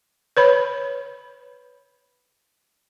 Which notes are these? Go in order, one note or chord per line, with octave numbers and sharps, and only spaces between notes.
B4 C#5 B5